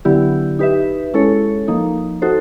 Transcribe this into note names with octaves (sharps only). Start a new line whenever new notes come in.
D3 F#3 B3 E4 G4
D#4 G4 B4 E5
G#3 C#4 E4 A4 C#5
F3 A#3 D#4
D#4 F#4 A4 C5